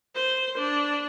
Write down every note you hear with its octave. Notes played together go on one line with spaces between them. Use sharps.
C5
D4